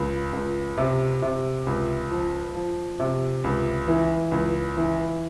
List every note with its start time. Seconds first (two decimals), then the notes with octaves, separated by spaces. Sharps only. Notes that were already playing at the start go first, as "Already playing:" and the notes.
Already playing: C#2
0.33 C#2
0.78 C3
1.22 C3
1.67 C#2
2.11 F3
2.55 F3
3.00 C3
3.44 C#2
3.88 E3
4.32 C#2
4.77 E3